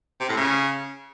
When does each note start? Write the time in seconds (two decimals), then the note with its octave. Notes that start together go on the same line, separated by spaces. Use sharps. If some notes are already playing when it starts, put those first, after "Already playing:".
0.20 C3
0.29 A2
0.37 C#3